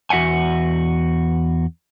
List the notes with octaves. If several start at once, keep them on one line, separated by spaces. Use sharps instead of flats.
E2 F#4 E5 F#5 G#5